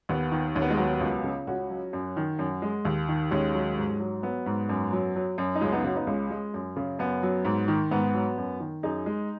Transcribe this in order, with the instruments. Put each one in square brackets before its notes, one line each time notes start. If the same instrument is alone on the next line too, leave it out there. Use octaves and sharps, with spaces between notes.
[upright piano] D#2 B3
D#3
D#2 C#4
B3
G#3
F#3 B3
C#2
C#3
C#2 C#4 F#4
F#3
F#2
D#3
F#2
G#3
D#2
D#3
D#2 G#3 C#4
F#3
G#2
F#3
F#3 B3
G#2
F#2
F#3
F#3
F#2
D#4
C#2 G#3 C#4
B3 D#4
C#3 C#4 F#4
B3 D#4
C#2 G#3 C#4
G#3
F#2
C#3
F#2 B3
F#3
G#2
D#3
G#2 B3
F#3
F#2
D#3
F#2 D#4 G#4
G#3